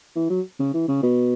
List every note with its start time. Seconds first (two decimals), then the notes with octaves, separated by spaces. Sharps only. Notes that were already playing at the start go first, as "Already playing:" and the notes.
0.16 E3
0.30 F#3
0.60 C#3
0.74 E3
0.88 C#3
1.03 B2